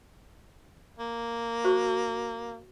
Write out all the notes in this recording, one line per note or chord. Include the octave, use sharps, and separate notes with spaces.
A#3
F#4 C5 C#6